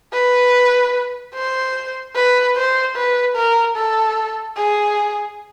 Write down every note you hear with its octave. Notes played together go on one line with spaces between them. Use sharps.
B4
C5
B4
C5
B4
A#4
A4
G#4